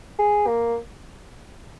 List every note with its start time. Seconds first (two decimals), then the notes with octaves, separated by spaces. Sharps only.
0.19 G#4
0.47 A#3